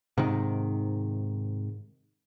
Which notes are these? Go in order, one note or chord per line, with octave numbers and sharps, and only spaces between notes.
G#2 C3 D#3